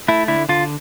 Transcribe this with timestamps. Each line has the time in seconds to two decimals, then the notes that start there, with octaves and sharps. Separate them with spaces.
0.08 A3 E4
0.28 D3 E4
0.49 D3 F4